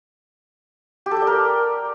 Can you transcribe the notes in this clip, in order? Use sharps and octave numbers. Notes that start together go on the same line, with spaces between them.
G4
A4
G5
D5
A#4